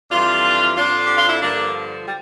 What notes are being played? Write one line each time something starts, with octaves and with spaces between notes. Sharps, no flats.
F2 E3 G3 D4 F4
F2 D3 F3 D4 F4
G4
F4
E4
G2 D3 F3 A#3 D4
G3